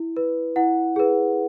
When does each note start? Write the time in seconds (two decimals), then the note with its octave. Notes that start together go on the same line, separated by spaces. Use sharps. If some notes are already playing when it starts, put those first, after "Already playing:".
Already playing: E4
0.17 B4
0.56 E4 F#5
0.96 G#4 B4